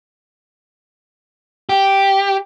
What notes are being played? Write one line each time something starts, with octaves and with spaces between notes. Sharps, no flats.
G4